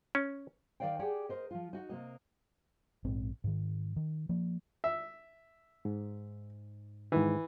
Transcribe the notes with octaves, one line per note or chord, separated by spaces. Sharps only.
C#4
D#3 G3 D5 F5 G5
G4 G#4 D5 F#5 G5
A#4 C5 D#5
F3 F4
D#4 F#4
C3 A#3 D#5
A#1 G#2 C4
G#2 D#3
D#3
F3 A#3
E5
G#2
G#2 D#3 E3